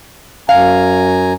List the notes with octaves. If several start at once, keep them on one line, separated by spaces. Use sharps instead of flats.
F#2 F5 G#5 A#5